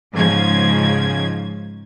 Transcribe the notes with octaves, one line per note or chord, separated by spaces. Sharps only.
G#2 C#3 F3 G#6